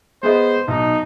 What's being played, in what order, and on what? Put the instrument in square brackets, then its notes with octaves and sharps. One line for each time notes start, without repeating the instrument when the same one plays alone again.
[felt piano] G#3 B3 D#5 [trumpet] C5
[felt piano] B1 [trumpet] D#4